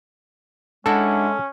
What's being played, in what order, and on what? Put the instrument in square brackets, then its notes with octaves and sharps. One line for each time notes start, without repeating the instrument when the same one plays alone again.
[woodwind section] G#3 [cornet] C#4 [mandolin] D4 E4 F#4 [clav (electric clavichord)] A4